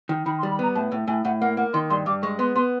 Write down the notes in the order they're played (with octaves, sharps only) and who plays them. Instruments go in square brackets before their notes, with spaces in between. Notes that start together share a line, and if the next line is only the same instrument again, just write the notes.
[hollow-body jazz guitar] D#3
[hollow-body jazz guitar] D#3 [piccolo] B5
[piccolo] C6
[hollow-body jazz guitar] G3
[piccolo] B5
[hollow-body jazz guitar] B3 [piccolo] A#5
[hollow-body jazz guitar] A2 [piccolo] A5
[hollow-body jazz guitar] A2
[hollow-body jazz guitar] A2 [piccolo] G#5
[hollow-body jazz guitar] A2 [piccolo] F#5
[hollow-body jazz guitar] A#3 [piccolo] F#5
[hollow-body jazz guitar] A#3 [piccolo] F#5
[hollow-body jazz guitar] D#3 [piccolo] C6
[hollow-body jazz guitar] G2 [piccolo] C6
[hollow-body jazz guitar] G2 [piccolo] D6
[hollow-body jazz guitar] G#3 [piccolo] C#6
[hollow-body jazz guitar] B3 [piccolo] C6
[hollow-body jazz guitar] B3 [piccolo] C6